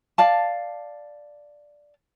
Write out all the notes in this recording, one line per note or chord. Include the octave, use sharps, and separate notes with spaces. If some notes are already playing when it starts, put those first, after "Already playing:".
D5 F5 A5